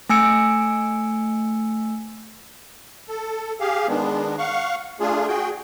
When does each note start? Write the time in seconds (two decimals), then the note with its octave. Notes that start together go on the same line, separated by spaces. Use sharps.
0.09 A3 G#5 E6 C#7 D7
3.09 A4
3.60 G4 G#4 F5
3.88 D#3 G#3 B3 D4
4.38 F5 F#5 C#6
5.00 A3 D4 F4 G#4
5.28 F#4 G#4 G5